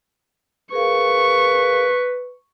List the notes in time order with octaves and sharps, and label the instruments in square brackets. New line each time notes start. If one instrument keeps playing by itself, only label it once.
[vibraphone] G#4 A#4 F5 [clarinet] B4 [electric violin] C#6